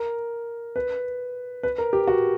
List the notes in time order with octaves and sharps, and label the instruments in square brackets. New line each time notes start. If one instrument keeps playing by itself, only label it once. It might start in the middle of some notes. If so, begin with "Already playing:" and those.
Already playing: [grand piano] A#4
B4
B4
A#4
G4
F#4